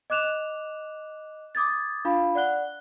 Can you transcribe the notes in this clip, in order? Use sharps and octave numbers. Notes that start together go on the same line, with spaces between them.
D#5 D6 F#6 E7 F7
D6 D#6 G#6 A6
D4 F4 F5 B5
D5 F#5 F#6 G7